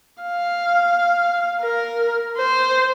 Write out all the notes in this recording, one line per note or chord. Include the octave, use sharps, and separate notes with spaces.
F5
A#4
C5